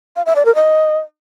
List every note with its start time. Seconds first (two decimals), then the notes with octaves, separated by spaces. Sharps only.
0.16 F5
0.26 E5
0.36 D5
0.45 A#4
0.55 D#5